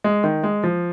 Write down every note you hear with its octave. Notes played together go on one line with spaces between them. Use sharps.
G#3
D#3
G#3
F3